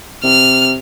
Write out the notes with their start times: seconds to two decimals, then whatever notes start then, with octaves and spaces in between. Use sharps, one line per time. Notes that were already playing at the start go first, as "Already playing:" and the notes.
0.24 C3 F6